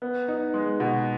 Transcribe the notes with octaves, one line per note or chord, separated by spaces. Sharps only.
B3
D#4
G#3
B2